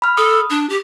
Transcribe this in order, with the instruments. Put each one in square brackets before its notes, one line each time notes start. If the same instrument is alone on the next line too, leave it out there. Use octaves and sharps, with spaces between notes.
[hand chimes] B5 F6
[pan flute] A4 [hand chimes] D#6
[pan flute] D4
G4